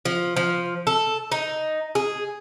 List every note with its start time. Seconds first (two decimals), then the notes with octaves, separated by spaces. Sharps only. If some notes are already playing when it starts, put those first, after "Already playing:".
0.05 F3
0.36 F3
0.87 A4
1.32 D#4
1.95 G#4